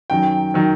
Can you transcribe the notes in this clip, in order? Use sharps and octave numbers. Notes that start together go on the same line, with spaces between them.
F#2 D#3 F#3 G5
D#3 F#3